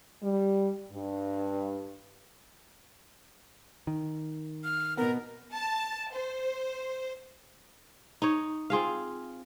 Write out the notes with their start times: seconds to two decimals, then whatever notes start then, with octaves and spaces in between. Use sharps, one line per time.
0.22 G3
0.92 G2
3.87 D#3
4.64 F6
4.97 B2 B3 A#4
5.54 A5
6.14 C5
8.22 D#4 C#5
8.70 C4 F4 G#4 F5